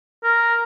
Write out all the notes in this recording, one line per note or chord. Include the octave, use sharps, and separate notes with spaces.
A#4